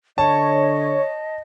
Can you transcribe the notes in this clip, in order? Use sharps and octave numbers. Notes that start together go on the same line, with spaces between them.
D3 C#5 D#5 A5